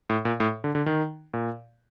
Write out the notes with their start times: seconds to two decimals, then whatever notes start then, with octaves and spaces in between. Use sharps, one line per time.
0.10 A2
0.25 A#2
0.40 A2
0.64 D3
0.75 D3
0.86 D#3
1.34 A#2